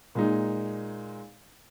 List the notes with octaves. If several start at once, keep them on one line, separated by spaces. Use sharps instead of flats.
A#2 G#3 D#4